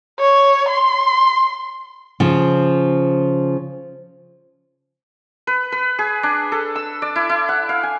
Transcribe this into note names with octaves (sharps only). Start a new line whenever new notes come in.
C#5
C6
C#3 F3
B4
B4
G#4
D4
A4
E6
D5
E4
E4
F#5
F5
G#5